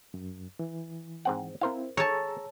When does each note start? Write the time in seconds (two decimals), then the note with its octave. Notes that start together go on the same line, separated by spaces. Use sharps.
0.14 F#2
0.59 E3
1.25 G#2 C4 F#5
1.61 C4 E4 A#4 C5 F5
1.97 G#4 C#5 A5 A#5 E6